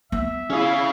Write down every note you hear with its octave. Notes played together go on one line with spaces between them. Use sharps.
B3 E5
C#4 E4 G#4 F5